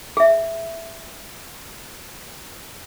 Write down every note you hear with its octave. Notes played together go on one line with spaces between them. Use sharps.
G#4 E5